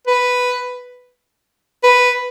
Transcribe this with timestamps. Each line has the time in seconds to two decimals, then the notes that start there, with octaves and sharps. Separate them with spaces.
0.07 B4
1.83 B4